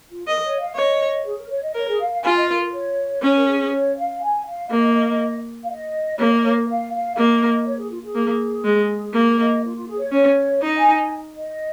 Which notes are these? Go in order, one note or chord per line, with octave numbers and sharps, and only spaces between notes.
F4
A#4 D#5
C#5
F5
C#5 D#5
G#4
A#4
C#5
D#5
A#4 C#5
G#4
F5
F5
F4 G#5
D#5
A#4
A#4
C#5
C#4 C#5
A#4
G#4
G#4
C#5
F5
G#5
F5
A#3 D#5
F5
D#5
A#3 C#5
D#5
C#5
A#4
F5
F5
A#3 D#5
C#5
G#4
F4
G#4
A#3
G#3
A#3 A#4
D#5
F4
F4
G#4
C#5
C#4 C#5
D#4 D#5
G#5
G#5
D#5